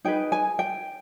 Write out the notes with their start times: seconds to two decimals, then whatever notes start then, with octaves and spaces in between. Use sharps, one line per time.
0.05 D#4 G#4 B4 G5
0.32 G#5
0.59 G5